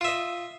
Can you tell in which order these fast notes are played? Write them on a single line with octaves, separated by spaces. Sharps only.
F4 E5 D#5